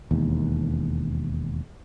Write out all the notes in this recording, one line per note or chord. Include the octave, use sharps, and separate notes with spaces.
E1 D#2